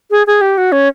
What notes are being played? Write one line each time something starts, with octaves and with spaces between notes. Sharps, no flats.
G#4
G#4
G4
F#4
C#4